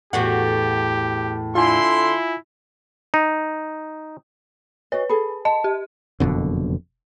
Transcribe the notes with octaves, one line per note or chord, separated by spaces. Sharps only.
E2 A2 F#4 G4
D3 E4 F4 G#5 C6
D#4
F#4 B4 C#5 D#5
G#4 A4 B5
D#5 A5
G4
F#1 F2 B2 D3